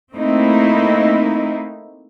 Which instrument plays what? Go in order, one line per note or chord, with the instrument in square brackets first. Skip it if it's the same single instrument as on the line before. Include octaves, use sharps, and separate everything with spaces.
[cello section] A3 A#3 C4 D#4 E4